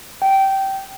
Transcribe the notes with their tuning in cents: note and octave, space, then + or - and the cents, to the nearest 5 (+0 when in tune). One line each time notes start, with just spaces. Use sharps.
G5 -15